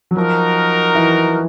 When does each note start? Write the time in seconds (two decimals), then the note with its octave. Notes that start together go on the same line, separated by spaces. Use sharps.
0.11 F#3
0.16 F3 D#4 F#4 A#4
0.95 E3